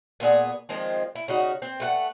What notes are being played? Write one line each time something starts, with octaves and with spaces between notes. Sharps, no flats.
A#2 B3 F4 G#4
D#3 F3 G#3 C4
E4
C#3 D#4 F#4
C4
A3 B4 F#5